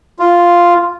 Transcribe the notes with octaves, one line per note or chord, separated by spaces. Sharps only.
F4